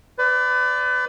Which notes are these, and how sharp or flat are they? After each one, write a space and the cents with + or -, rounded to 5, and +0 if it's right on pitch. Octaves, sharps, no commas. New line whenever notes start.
B4 +35 D5 -10